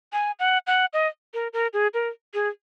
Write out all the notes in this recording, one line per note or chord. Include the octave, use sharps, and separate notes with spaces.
G#5
F#5
F#5
D#5
A#4
A#4
G#4
A#4
G#4